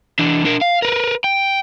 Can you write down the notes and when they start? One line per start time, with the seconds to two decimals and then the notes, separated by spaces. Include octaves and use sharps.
0.19 E3 D4
0.45 D4 A#4
0.61 F5
0.82 A#4 B4
1.24 G5